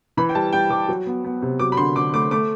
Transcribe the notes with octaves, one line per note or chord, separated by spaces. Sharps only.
E3 B5
G5
G3 A5
G3 G5
G3 D6
F#3
B3
B3
C3
F#3 D6
B5
D3 C6
D3 D6
A3 D6
A3 D6